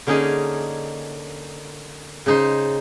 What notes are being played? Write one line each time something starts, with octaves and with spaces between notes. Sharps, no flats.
D3 A#3 C#4 D#4 G#4
C#3 D#4 C5